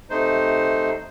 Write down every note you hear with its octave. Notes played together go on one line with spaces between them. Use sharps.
C3 A3 D#4 C5